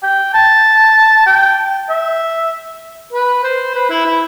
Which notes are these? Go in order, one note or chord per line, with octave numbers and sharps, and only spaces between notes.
G5
A5
G5
E5
B4
C5
B4
E4
E4